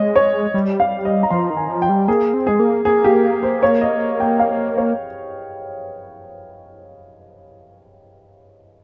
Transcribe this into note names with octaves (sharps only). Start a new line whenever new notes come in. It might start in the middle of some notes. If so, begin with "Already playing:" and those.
Already playing: G#3 C#5 D#5
C#5
G3
F5
D#5
A#5
F3 C6
D#3
G#5
F3
G5
G3
A#3 G#4
C4
G#3 G#4
A#3
A#3 G#4
G4
C5
C#5
D#5
G5
F5
C#5